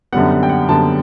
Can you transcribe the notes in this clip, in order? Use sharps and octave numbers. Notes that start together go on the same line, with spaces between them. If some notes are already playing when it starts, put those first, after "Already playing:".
F#2 D3 G3 B3 F#5
F#5
G5
F#5
F#2 D3 G3 B3 A5